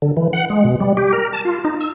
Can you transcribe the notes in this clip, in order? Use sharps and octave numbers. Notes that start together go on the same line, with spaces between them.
D3
E3
F#5
G#3
B2
G3
G4
A#4
A5
F4
D#4
E6